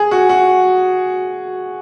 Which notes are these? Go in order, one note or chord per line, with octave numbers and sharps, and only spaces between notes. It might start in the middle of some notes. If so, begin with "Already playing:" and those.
Already playing: G#4
F#4
F#4